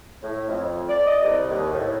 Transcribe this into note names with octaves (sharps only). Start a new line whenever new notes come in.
A2
F2
D5
D#5
C2
D#2
A2